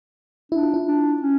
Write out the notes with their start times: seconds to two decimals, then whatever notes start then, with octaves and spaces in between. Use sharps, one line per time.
0.52 D4 E4
0.63 F4
0.74 E4
0.88 D4
1.22 C#4